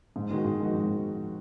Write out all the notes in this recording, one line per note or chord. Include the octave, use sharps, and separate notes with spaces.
G#2
D#3 G#3 D#4 F#4
G#2
D#3 G#3 D#4 F#4
G#2